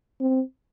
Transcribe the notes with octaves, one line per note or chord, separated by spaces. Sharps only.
C4